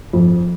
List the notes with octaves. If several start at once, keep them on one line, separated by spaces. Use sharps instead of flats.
F2